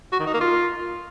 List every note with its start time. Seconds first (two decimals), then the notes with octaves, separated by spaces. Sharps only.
0.12 F#4
0.19 D#3
0.27 D#4
0.34 A#3
0.41 F4